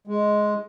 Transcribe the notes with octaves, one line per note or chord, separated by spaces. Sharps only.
G#3